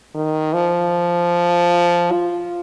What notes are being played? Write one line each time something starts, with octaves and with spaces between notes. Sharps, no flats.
D#3
F3
F4